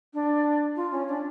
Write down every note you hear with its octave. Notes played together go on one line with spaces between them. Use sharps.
D4
F4
C#4
D4